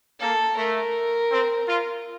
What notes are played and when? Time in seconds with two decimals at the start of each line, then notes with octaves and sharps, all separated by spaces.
0.20 A#3 A4
0.57 A3 A#4
1.31 C4
1.68 F4